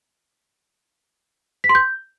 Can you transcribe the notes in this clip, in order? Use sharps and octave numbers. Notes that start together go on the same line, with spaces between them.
B6
C6
G6